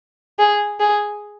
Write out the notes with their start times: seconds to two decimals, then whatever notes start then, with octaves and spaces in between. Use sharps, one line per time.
0.39 G#4
0.80 G#4